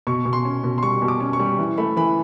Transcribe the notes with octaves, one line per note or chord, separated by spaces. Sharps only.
B2 C#6
B2
C6
C#4
B2
C6
G3 C#6
B2
D6
C#4
C#6
G3
E3
A3 B5
E3 B5